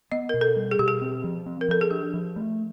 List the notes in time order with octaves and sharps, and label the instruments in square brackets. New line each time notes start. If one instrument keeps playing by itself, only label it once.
[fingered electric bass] B3 [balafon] D#5
[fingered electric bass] B2 [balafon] A#4
[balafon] A4
[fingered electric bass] G3
[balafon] G#4
[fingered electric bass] B2 [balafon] G4
[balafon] G#4
[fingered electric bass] C4
F3
C4
[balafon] A#4
[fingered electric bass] F3 [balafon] A4
[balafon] G#4
[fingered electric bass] D4 [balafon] G4
[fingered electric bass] F3
A3